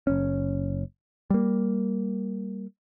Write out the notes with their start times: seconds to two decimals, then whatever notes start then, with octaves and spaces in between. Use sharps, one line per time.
0.07 F#1 C#4
1.30 G3 A#3